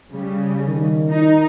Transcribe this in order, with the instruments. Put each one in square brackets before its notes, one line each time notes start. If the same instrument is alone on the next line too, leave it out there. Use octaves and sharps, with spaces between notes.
[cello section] C#3 G3
[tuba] D#3
[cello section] D#4